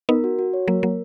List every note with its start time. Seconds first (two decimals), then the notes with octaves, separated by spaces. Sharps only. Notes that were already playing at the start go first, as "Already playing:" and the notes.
0.09 B3 D#4 A#4
0.24 F#4
0.39 F#4
0.54 C#5
0.68 F#3 A#3 A#4
0.83 F#3 A#3 A#4